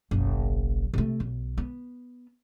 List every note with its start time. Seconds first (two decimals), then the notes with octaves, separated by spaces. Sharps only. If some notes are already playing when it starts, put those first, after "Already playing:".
0.11 F#1 B1
0.93 C3 A3
1.20 B1
1.58 B3